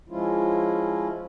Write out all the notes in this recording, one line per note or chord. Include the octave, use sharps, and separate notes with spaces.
F3 G#3 C#4 E4 F4